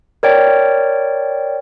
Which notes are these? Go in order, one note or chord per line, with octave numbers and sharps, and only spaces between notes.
A#4 C#5 D5 G5